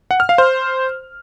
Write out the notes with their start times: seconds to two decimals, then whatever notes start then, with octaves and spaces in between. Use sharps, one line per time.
0.11 F#5
0.20 F6
0.29 F5
0.38 C5